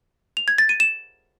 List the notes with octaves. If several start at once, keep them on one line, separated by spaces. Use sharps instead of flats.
F7
G#6
A6
D#7
E7